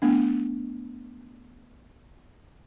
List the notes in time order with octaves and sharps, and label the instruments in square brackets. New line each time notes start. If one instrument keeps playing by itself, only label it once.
[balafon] A3 B3 D4